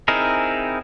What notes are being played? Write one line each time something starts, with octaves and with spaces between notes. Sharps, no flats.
C4 D#4 E4 G#4 A#4